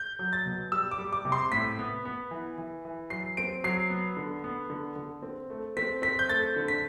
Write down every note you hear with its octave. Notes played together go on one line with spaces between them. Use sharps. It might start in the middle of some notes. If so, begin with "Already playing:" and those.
Already playing: G6
F#3
A6
B2
G3 E6
D6
G3
D6
C3
C6
A2 B6
B3
B3
E3
E3
E3
F#3 C7
C4 D7
F#3 C7
B3
D3
B3
D3
D3
C4
A3
C4 B6
C4 B6
G6
A3 A6
D3
B6